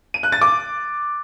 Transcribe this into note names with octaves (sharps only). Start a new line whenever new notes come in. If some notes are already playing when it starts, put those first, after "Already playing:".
D#7
F#6
A6
D6